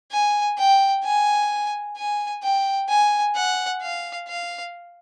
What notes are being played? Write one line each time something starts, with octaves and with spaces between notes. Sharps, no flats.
G#5
G5
G#5
G#5
G5
G#5
F#5
F5
F5